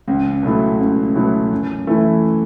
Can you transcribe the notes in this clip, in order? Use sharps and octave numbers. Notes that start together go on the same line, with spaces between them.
C#2
B2 F#3 A3 E4
C#2
B2 F#3 A3 E4
F#2
E3 A3 E4